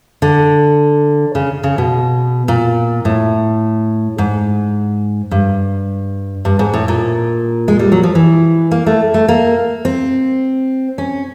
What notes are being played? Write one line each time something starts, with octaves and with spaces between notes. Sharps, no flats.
D3
C#3
C#3
B2
A#2
A2
G#2
G2
G2
G#2
A2
A#2
G#3
G3
F#3
F3
E3
A#3
A3
A3
A#3
C4
C#4